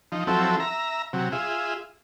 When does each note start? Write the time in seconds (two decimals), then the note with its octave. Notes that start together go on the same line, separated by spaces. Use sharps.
0.12 F3 D#4
0.27 F3 F#3 C4 E4 A4
0.60 E5 A#5
1.13 C3 F#3
1.32 F4 G#4 E5